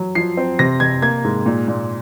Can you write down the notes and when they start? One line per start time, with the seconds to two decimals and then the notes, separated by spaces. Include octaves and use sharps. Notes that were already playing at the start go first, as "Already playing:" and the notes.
Already playing: F#3
0.15 F3 C7
0.37 C4
0.59 C3 A#6
0.80 C3 G#6
1.02 A#3 G#6
1.24 G#2
1.46 A#2
1.68 A#2